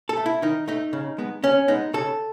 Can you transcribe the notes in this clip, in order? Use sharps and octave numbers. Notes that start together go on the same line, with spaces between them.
A4
A3
E4
D#3 D#4
A3 D#4
C#3
G#3 B3
C#3 C#4
G#3 B3 D#4
C#3 A4